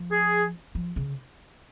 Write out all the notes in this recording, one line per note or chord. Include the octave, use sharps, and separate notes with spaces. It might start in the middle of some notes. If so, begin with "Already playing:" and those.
Already playing: F3
G#4
F3
C#3